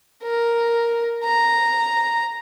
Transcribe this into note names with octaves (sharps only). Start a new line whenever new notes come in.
A#4
A#5